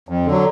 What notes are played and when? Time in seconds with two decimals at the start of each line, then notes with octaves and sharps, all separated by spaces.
0.09 F2
0.26 D3 F#3